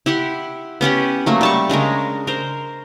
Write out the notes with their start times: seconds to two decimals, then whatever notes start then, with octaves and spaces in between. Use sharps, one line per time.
0.06 E4 G4 F#5 C6
0.81 B3 C#4 G4 F#5
1.26 F#3 A3 A#3
1.41 G3 A5 C#6
1.69 C#3 G#3 D4 A#4
2.27 A#4 C5